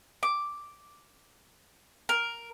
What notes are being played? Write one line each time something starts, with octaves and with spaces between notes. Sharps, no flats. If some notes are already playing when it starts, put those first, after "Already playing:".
D6
A#4